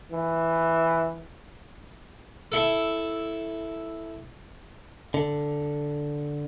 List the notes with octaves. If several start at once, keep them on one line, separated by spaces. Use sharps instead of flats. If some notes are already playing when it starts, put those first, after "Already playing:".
E3
E4 A4
D3